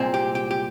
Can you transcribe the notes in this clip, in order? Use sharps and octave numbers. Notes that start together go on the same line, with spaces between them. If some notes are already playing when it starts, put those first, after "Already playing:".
Already playing: C2 A#2 G#3 C4
G4
G4
G4